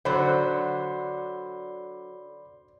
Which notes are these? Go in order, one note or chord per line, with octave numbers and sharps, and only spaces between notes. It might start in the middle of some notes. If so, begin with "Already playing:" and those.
D3 F#3 C5 D5 B5